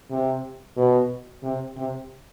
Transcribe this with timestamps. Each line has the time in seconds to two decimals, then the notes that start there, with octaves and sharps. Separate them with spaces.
0.10 C3
0.77 B2
1.43 C3
1.77 C3